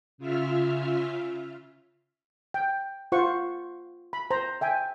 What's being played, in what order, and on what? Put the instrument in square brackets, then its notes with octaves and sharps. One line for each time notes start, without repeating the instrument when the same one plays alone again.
[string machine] C#3 F4 E5 F6
[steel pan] G5
F4 C5 F#5 C#6
B5
C5 A#5
E5 G5 G#5